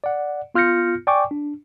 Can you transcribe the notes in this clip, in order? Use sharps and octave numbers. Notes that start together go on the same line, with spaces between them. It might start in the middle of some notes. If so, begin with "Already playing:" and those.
D5 F#5
B3 F4 F6 G6 A#6 C#7
D5 G5 G#5 C#6 D6
D4